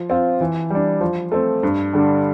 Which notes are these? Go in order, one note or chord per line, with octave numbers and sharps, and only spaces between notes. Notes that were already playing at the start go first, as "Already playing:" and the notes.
Already playing: F3
C4 F4
E3
G3 D4
F3
A3 C4
G2
D3 G3 D4